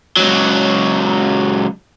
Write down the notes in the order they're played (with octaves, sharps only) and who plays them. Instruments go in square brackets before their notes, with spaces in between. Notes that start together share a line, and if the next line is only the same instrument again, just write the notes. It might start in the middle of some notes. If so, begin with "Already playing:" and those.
[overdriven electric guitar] C#2 F#3